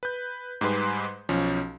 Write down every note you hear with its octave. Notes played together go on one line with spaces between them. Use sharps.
B4 G6
G#2 G3 G#3 B4 C6
B1 F3 C#4